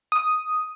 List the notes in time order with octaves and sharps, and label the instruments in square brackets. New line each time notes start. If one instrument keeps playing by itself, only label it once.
[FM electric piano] D#6